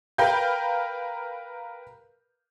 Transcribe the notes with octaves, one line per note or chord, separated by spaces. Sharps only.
A#4 B4 F5 G5 G6